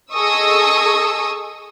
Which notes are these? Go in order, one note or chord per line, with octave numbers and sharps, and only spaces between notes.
G#4 A4 D#5 C#6 D#6 E6